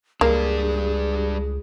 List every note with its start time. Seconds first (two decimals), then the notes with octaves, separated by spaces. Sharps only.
0.21 C#2 G3 A#3 D4 G#4